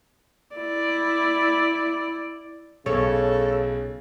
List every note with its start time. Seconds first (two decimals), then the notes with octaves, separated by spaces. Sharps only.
0.56 E4 D5
2.86 B1 C#3 A4 C#5